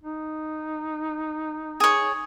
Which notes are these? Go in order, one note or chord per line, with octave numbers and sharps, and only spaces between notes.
D#4
G#4 C#5